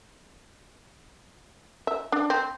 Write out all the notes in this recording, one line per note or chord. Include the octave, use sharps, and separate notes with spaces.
E5
D4
C4